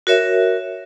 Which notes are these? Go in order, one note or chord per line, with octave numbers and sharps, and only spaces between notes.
F#4 A#4 C#5 E5